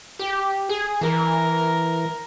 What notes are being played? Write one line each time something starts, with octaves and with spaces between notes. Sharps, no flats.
G4
G#4
E3 A#4